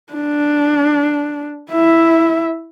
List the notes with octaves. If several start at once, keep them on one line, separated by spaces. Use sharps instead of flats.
D4
E4 E5